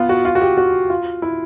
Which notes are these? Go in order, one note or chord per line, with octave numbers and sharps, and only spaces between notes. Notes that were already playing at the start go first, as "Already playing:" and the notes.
Already playing: B3 F4
F#4
F4
F#4
G4
F#4
F4
E4